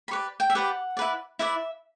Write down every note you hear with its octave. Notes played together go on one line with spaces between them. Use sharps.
B5
G4 B4 D5 C#6
G5
E5
G4 B4 D5 F#5
E4 B4 D5
E4 B4 D5 E5